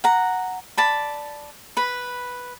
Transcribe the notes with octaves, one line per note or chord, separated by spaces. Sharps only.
F#5 A#5
D5 A5 B5
B4 B5